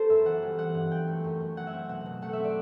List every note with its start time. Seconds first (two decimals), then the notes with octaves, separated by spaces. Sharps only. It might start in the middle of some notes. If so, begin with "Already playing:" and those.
Already playing: B3 A4 C5
0.09 F#2 E5
0.25 E3 F#5
0.42 G3
0.58 C4 F#5
0.74 G2
0.91 F#3 G5
1.07 A3
1.24 F#2
1.40 F#2
1.57 F#3 F#5
1.67 E5
1.73 C4
1.89 B2 F#5
2.06 B2
2.22 A3 F#5
2.33 E5
2.39 C4
2.44 D5